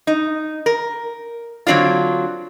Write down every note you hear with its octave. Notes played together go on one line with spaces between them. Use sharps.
D#4
A#4
D3 F#3 C4 D4 F4